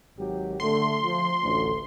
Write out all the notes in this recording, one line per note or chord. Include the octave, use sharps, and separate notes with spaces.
G#1 F#3 G4
D3 A3 C6
F3
A1 D2